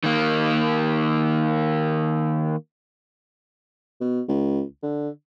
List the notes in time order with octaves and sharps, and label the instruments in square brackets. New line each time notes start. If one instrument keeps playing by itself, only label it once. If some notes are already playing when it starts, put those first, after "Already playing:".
[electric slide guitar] D#3 A#3
[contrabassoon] B2
C#2
D3